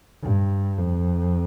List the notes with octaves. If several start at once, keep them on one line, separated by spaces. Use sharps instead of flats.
G2
F2